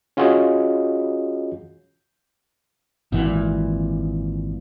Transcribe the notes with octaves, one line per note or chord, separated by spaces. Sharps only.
C#4 F4 F#4 G#4 C#5 D#5
G#1 A#2 E3